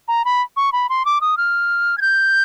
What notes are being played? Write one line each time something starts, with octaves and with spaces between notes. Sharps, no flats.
A#5
B5
C#6
B5
C6
D6
D#6
F6
G#6
G6